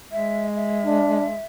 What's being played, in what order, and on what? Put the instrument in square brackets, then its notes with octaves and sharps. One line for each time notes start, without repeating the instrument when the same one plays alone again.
[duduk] G#3 [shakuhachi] E5
[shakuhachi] E5
[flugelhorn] D4